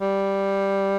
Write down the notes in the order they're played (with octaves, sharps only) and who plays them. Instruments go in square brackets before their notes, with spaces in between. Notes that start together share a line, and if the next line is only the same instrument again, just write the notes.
[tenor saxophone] G3